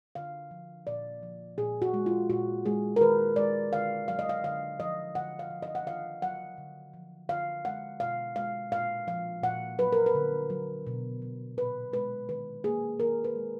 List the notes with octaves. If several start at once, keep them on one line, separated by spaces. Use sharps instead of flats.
D3 F5
F3
A#2 D5
F3
A#2 G#4
F#4
G#3
F4
A#2 F#4
G#3 G#4
A#4
D#3 B4
G#3 D5
D3 F5
F#3 F5
D#5
F5
D3 F5
F3 D#5
D3 F#5
F5
F3
D#5
F#5
D#3 F5
F#3 F#5
D3
F3
D3 F5
G#3 F#5
B2 F5
G#3 F5
A#2 F5
F3 F5
A#2 F#5
F#3 B4
A#4
B4
D3
F#3
B2
F#3
A#2 B4
G#3 B4
D#3 B4
A#3 G#4
D#3 A#4
B4
G#3